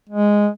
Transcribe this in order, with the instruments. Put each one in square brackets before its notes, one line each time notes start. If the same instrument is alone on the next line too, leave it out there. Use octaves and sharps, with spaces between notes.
[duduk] G#3